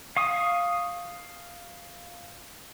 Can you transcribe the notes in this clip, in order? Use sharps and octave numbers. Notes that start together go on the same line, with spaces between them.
F5 C#6 D#6